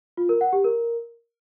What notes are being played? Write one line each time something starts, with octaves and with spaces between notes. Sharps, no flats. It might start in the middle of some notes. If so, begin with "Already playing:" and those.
F4
A#4
F#5
G4
A#4